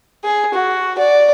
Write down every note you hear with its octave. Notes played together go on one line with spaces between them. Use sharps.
G#4
F#4
D5